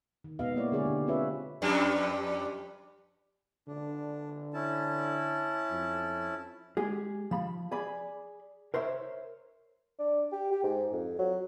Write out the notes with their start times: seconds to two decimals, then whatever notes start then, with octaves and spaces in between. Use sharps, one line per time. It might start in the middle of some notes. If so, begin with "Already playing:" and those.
0.24 D#3
0.39 B2 G#3 B3 F#4 D#5 F5
0.56 A#3 D#4 E4 C#5 D5
0.72 D3 G#3 G4 G#4 C#5 D5
0.85 D3 A#3
1.07 C4 F4 F#4 B4 C#5 E5
1.62 F2 G3 D4
3.68 D3 D4
4.54 C#4 E4 A5
5.70 F2
6.77 G#3 G4 G#4
7.31 F3 B5
7.71 G#4 D5 B5
8.74 A#4 C5 C#5 E5
9.99 D4
10.32 G4
10.52 G4
10.63 G#2
10.92 F2
11.18 F#3